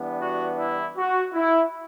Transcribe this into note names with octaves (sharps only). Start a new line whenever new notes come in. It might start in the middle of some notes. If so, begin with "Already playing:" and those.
Already playing: E3 G3 B3 D4
F#4
E4
F#4
E4